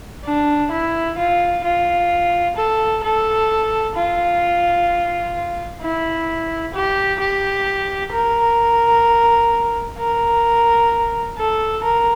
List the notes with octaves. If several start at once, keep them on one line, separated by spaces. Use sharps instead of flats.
D4
E4
F4
F4
A4
A4
F4
E4
G4
G4
A#4
A#4
A4
A#4